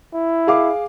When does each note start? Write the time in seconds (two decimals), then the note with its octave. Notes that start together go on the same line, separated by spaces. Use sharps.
0.14 E4
0.47 G#4 F5 D6